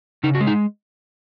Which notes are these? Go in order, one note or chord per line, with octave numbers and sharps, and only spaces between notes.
C#3 D#4
F#4
G#3
D#4